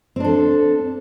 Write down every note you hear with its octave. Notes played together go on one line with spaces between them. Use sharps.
C4 D4 A4